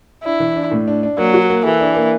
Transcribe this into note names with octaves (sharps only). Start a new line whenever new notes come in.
D4 E4
E3
D4
A2
D4
D4
F#3 A#3
F#4
A#3
E3 A4
D4
A#3